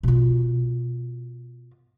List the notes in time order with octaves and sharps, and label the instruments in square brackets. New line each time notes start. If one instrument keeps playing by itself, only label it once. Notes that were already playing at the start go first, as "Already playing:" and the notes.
[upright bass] B2 F4